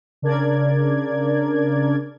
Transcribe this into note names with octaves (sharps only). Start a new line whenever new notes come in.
C#3 D4 A#4 D5 G#6